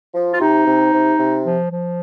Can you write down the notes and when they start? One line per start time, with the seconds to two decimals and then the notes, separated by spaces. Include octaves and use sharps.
0.13 F3
0.34 F4
0.39 C3 D#4
0.65 C3
0.92 C3
1.17 C3
1.43 F3
1.69 F3